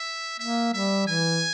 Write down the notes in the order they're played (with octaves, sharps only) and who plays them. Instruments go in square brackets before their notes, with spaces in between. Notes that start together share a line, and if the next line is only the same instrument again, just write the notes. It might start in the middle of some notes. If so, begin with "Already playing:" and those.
Already playing: [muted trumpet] E5
[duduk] A#3 [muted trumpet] E5
[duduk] G3 [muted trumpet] E5
[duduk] E3 [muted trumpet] G#5